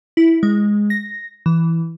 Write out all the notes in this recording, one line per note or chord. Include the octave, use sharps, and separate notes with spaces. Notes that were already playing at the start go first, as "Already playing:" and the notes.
E4
G#3
A#6
E3